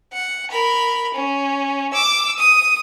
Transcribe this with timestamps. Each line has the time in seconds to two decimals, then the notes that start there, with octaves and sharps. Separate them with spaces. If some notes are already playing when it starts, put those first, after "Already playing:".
0.13 F#5
0.51 A#4 B5
1.14 C#4
1.93 D6 E6
2.38 D#6